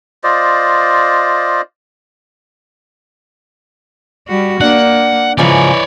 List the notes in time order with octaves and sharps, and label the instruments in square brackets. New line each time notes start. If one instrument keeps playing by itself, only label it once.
[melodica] F4 C5 D5 D#5
[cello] G3 F#4
[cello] A#3 [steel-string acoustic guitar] D4 [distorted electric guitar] F#5
[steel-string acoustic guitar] G#2 C#3 F3 [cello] E3 [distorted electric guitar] C#5 D5